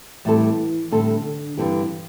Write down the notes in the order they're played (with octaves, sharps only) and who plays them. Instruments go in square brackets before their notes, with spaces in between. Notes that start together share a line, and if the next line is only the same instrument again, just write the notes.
[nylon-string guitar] A2 G3 C4 A4 [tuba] E3
[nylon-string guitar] A2 G3 C4 A4 [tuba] D3
[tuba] D3
[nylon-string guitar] G2 D3 C4 G4 [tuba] E3